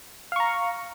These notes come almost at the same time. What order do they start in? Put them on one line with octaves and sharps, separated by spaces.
F5 C#6 A#5